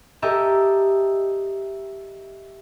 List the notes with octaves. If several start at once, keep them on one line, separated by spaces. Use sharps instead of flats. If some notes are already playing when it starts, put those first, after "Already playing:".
G4 A4 A#4 D#5 E5